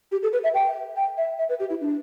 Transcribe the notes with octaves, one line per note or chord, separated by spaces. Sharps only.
G4
A4
B4
E5
G5
G5
E5
E5
B4
G4
E4
D4